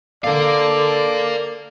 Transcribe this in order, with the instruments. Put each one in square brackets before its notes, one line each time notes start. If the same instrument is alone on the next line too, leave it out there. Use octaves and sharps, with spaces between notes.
[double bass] D3 [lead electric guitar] A#4 F5 [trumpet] D5